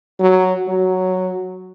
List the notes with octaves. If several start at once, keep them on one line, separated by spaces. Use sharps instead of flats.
F#3
F#3